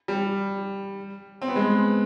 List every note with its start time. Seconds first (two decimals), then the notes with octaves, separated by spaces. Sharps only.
0.08 G3
1.42 C4
1.48 B3
1.56 G#3